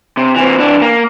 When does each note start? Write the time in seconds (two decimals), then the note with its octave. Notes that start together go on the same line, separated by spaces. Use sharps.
0.17 C3
0.36 E3 C4
0.59 E3 D4
0.82 A#3